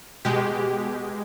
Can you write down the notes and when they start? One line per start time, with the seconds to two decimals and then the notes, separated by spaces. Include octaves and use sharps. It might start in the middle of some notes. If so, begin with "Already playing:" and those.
0.25 B2 G#3 G4